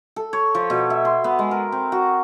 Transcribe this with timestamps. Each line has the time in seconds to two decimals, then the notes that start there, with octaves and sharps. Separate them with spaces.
0.16 A4
0.33 C#5
0.55 F3
0.70 B2
0.90 E5
1.05 C6
1.24 B3
1.39 G#3
1.51 A#4
1.72 C4
1.92 F#4